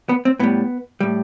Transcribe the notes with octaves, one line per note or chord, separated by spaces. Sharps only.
B3
C4
A2 G3 B3
A2 G3